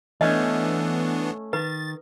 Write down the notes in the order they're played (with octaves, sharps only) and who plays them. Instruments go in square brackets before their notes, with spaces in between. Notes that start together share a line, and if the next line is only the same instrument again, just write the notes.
[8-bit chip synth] E3 B3 D4 [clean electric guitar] A3 C#4 [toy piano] D#5
[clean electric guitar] D#3 [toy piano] B4 [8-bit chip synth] A6